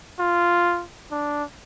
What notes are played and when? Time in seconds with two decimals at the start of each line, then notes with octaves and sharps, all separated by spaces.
0.19 F4
1.11 D4